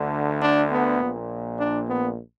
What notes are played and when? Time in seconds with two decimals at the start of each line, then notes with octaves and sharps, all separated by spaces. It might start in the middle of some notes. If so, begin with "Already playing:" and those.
Already playing: D2 D3
0.41 D4
0.70 B3
0.99 A#1 A#2
1.58 D4
1.88 B3